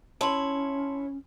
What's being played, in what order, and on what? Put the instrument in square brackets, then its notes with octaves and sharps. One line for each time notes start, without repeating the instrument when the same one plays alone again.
[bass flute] C#4 [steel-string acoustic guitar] E4 C#5 [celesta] A5 C6 F#7